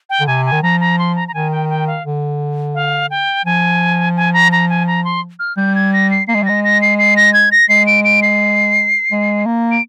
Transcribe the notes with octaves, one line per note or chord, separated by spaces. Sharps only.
G5
D3
C3 G#5
G#5
D#3
F3 A#5
A#5
C6
A#5
A#5
D#3 G#5
G5
G5
F5
D3
F5
G5
F3 G#5
G#5
A#5
A#5
G#5
A#5
C6
F6
G3 G6
G#6
A#6
C7
A#3 C7
G#3
G3
G#3 A#6
A#6
C7
C7
A#6
G#6
A#6
G#3 C7
D7
D7
C7
G#3
A#3
D7